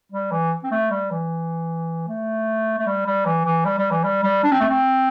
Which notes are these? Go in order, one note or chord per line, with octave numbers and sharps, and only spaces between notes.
G3
E3
C4
A3
G3
E3
A3
A3
G3
G3
E3
E3
G3
G3
E3
G3
G3
D4
C4
A3
C4